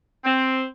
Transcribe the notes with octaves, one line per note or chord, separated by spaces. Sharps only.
C4